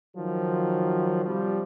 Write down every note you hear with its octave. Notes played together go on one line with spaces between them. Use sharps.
D#3 F3 F#3
C3 F3 G3